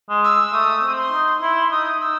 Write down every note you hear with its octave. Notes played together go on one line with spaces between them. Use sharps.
G#3
E6
A3 D#6
C4
C6
D#4
E4 C6
D#4 D#6
D#4 E6